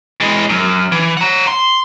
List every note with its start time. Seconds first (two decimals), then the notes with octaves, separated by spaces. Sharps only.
0.20 E3 G#3
0.49 F#2
0.92 E3
1.17 F#5 A#5
1.47 C6